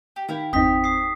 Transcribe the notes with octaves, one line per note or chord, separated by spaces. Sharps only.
G4
D#3 E4 F5 G5
G1 E2 C4 D#4 G4 D#6 B6
D#6 C7